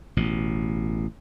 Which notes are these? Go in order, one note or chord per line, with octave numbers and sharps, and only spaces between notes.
A1 B2